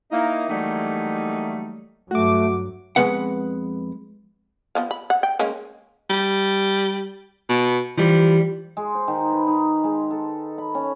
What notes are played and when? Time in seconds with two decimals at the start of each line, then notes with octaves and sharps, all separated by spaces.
0.11 A#3 D#4 E4
0.49 E3 F#3 G3 A3 A#3 D#4
2.11 G2 F#3 A3 F#4 D6
2.96 F2 E3 G#3 B3 B4 F#5
4.75 F3 B3 F5
4.91 B5
5.10 F#5
5.23 G5
5.39 G#3 A#3 C#4
6.10 G3
7.49 B2
7.98 E3 F3 G3
8.77 G#3
8.95 C5
9.08 D#3
9.32 B4
9.47 D#4
9.84 G#3
10.11 A4
10.58 B5
10.75 C#4